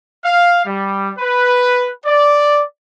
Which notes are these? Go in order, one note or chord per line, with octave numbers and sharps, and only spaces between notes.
F5
G3
B4
D5